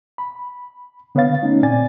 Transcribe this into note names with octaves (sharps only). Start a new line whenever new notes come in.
B5
D3 B3 B4 C#5 F5 A6
A3 C#4 D#4
A#2 C4 D5 G#5 A6